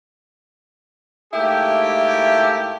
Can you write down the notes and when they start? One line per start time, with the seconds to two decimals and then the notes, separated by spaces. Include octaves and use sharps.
1.34 G#2 A3 A#3 E4 G4